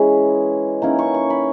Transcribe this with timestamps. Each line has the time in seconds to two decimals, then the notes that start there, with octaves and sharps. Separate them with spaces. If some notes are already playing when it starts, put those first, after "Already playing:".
Already playing: E3 G#3 C#4 B5
0.82 D#3 A#3 C#4 E4 A#5
0.99 C#6
1.14 C#6
1.30 B5